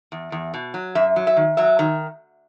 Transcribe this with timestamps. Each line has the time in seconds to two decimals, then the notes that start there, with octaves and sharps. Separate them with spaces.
0.12 E2
0.32 E2
0.54 B2
0.74 F#3
0.95 F#2 E5
1.16 F#3
1.27 E5
1.37 D#3
1.57 F#3 E5
1.79 D#3